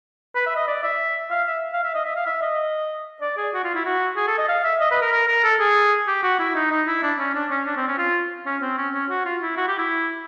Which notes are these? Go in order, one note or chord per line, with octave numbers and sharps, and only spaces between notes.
B4
E5
D#5
D5
E5
F5
E5
F5
E5
D#5
E5
F5
E5
D#5
D5
G#4
F#4
F4
E4
F#4
G#4
A4
D#5
F5
E5
D#5
B4
A#4
A#4
A#4
A4
G#4
G4
F#4
E4
D#4
D#4
E4
D4
C#4
D4
C#4
D4
C4
C#4
F4
C#4
C4
C#4
C#4
F#4
F4
E4
F#4
G4
E4